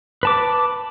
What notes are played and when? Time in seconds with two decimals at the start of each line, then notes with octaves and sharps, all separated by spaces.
0.23 B4 A5 D6